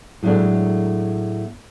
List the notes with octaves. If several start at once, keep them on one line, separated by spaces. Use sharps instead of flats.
A2 F#3 G#3 A3 D4